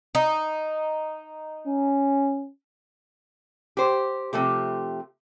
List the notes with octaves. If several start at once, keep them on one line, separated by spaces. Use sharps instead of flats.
D#4
C#4
G4 C5
C3 F3 A3 G4